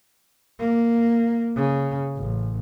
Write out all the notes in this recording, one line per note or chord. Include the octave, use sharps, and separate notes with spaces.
A#3
C#3
A1